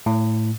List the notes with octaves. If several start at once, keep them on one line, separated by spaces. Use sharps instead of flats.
A2